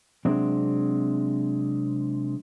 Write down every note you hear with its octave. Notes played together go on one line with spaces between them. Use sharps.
C3 F#3 G#3 C4 D4